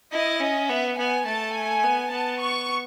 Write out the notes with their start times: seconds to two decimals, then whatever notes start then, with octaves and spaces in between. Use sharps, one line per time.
0.12 E4 D#5
0.40 C#4 D#5
0.69 B3 E5
0.98 B3 G#5
1.26 A3 A5
1.55 G#5
1.84 B3
2.12 B3 A5
2.40 C#6